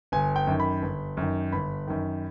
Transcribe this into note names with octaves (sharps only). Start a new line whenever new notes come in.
G1 G#5
G5
F#2 D#3
B5
G1
F#2 D#3
G1 B5
F#2 D#3